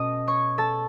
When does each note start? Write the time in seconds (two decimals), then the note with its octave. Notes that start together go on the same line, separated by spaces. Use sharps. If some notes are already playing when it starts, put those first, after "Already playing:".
Already playing: B2 A3 C#4 D#5 D#6
0.27 C#5 C#6
0.58 A4 A5